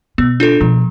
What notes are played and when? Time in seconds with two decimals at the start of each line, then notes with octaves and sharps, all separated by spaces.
0.18 B2 B3
0.40 D4 F4 A4
0.61 B2 F3